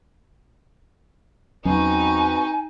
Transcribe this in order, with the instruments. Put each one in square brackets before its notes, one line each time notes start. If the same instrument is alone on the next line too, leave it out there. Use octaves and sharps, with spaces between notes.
[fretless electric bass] E2 F#3 C#4 [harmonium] C4 F#4 B4 [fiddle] D#4 [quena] G#5